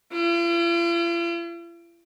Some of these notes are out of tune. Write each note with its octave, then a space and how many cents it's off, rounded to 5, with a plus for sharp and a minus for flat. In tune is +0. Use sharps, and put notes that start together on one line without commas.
F4 -45